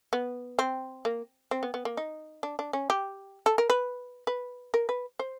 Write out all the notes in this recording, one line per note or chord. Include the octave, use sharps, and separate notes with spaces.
B3
C4
A#3
C4
B3
B3
A#3
D#4
D4
D4
C#4
G4
A4
A#4
B4
B4
A#4
B4
C5